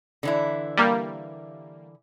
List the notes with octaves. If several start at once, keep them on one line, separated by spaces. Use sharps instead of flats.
D3 E3 E4
G3 A#3